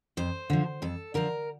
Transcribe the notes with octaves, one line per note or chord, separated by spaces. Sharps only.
F2 C5
D3 F3
F2 A4
D3 F3 A#4